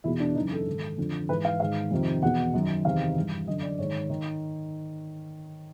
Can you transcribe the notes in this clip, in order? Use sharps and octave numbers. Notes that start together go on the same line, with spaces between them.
E2 B2 E4
D4
F#2 C#3 E3 D#4
A4
G#2 D#3
F2 D3
G#2 E3 B4
F5
G#2 D#3 F5
F2 C3 D#3
E2 B2 F#5
F#2 D#3
E2 C3 D#3 F5
G2 E3
F#2 D3 D#5
D5
G#2 D#3 C#5
D#3